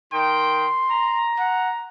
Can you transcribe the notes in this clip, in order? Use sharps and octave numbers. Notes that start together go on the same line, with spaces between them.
D#3 G5 C6
A#5
F#5